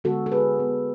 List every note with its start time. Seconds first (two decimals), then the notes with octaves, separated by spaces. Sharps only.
0.04 D3 G#3 B3 F#4 A4
0.26 A4
0.32 G#4 B4
0.59 D3 G#3 B3